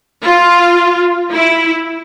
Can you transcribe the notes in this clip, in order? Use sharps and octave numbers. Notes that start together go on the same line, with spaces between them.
F4
E4